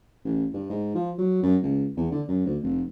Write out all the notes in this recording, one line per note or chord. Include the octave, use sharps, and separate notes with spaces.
A1
G2
G#2
F3
F#3
F#2
C#2
E2
D3
F#2
D2
F1